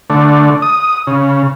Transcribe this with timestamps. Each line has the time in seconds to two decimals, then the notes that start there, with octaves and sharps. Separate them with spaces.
0.10 D3 A3
0.62 D#6
1.07 C#3